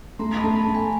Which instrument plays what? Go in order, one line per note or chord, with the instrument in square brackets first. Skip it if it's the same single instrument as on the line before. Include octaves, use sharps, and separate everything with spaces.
[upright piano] A3 [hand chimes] A#5 C6
[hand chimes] A5 B5
[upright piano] A3
[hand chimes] A5 B5
[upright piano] A3
[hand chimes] G#5 A#5